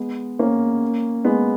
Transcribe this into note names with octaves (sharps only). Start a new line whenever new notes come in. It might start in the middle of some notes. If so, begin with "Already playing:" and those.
Already playing: G#3 B3
A#3 C#4
G#3 B3